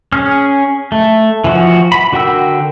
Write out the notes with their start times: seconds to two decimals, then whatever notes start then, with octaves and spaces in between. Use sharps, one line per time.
0.12 C#4 G#4 F6
0.92 A3
1.44 E3 F3 F#4
1.92 B5
2.12 D3 F#4 A#4 G5 E6